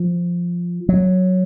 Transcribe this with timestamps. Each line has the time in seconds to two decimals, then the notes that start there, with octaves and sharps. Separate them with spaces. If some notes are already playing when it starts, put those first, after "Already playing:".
Already playing: F3
0.89 F#3